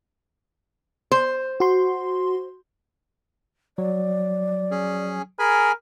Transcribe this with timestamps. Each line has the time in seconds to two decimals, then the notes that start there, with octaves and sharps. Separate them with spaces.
1.12 C5
1.60 F#4 C6
3.78 F#3 D5
4.71 C#4 G#4
5.39 G#4 A#4 G#5 B5